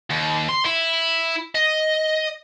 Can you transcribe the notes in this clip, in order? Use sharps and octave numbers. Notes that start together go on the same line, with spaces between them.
D#2
C6
E4
D#5